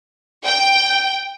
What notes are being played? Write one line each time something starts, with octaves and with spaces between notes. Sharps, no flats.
G5